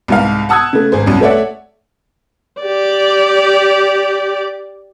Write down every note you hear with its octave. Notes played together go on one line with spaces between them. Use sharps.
C2 G#2 F5
F#5 A5 D#6 E6 F#6 G#6
C#3 A3
G#1 G#4 C5
C2 F#2
A3 C#5 D5 E5 F#5
G4 D5